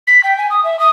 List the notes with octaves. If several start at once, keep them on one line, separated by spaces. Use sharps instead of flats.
B6
G5
G#5
D#6
E5
D#6